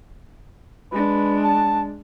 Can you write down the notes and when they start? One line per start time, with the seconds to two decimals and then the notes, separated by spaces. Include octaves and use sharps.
0.92 G#3 D4 B4
1.44 A5